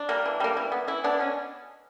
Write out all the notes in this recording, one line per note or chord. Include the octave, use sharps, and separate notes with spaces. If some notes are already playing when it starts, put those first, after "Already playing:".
Already playing: D4
G3 A#3
E3
G3 A#3
E3
B3
E3 E4
B3 D4
B2 C#4